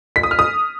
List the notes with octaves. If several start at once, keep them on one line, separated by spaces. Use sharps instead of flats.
B6
D#6
F6
D#6